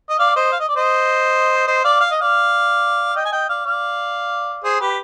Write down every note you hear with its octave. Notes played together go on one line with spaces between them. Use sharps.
D#5
D5 F5
C5 D#5
F5
D#5
D5
C5 D#5
C5 D#5
D5 F5
F5
D#5
D5 F5
D#5 G5
G#5
D#5 G5
D5 F5
D5 F5
G#4 C5
G4 B4